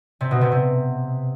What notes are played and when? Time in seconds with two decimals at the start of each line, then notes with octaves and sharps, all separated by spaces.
0.21 C3
0.31 B2
0.41 C3
0.52 C3